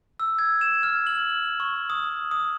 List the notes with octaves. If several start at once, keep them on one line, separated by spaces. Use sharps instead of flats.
E6
G#6
E7
F6
F#7
C#6
D#6
D#6